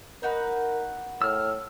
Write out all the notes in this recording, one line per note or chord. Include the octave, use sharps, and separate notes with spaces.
D#4 F#4 A#4 B4
A2 E6 F6